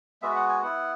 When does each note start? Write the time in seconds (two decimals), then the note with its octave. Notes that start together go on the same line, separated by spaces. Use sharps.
0.22 G#3 B3 F#4 E5
0.36 F#5
0.49 G#5
0.63 B3 E4 F#5